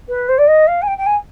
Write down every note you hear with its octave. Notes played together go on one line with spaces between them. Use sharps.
B4
C5
D5
D#5
F5
G#5
G5
G5
G#5